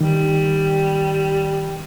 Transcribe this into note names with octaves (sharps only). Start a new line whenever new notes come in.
D#3 G3